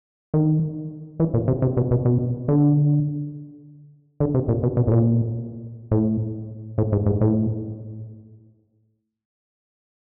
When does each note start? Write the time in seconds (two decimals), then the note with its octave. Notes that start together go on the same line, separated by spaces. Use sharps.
0.34 D#3
1.20 E3
1.34 A#2
1.48 C3
1.62 C3
1.77 B2
1.91 B2
2.05 B2
2.48 D3
4.20 D3
4.35 C3
4.48 A#2
4.63 B2
4.77 B2
4.87 A2
4.92 A#2
5.91 A2
6.78 A2
6.92 G#2
7.06 G#2
7.21 A2